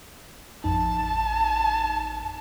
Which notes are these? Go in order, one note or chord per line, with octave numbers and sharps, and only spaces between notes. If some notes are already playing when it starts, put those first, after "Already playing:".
A1 F2 D#4 A5